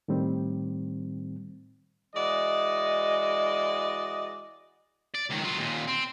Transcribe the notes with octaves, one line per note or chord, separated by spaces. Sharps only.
A2 D#3 G3 C4
E3 G#3 F#4 D5 D#5
D5
C#2 D#3
F#3 F4
D#2 A#2
C4